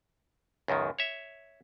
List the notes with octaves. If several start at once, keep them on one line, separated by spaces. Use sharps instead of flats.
C#2 F#2 B2 D#3
C#5 E5